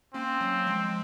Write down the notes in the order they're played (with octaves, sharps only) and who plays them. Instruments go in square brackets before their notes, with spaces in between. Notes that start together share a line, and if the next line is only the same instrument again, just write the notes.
[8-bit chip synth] A#3 C#4 [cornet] C4
[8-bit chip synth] F#3 A#3
F3 G#3